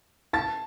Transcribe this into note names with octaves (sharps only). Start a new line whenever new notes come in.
A5 A6